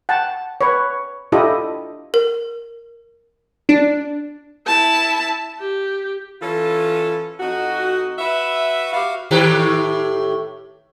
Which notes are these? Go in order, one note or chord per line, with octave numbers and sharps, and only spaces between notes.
F#5 G5 A5
B4 C#5
D4 E4 F4 G4 A4 D#5
A#4
D4
E4 A5
G4
E3 C#4 F4 A4
F2 D#4 F#4
F#4 B4 E5
F#4 G4 E5 F5
A2 D#3 G4